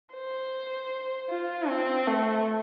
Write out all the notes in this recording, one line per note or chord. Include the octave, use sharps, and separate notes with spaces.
C5
F4
C4
A3